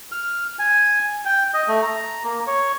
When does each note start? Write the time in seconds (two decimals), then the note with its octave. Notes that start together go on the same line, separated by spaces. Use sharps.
0.12 F6
0.59 G#5
1.25 G5
1.54 D#5
1.68 A3
1.82 A#5
2.24 A#3
2.47 C#5